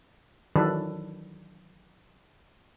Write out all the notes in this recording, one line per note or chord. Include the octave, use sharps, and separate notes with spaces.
D#3 E3 F#3 D4 A4 B4